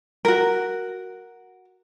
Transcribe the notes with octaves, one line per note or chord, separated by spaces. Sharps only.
F#4 A#4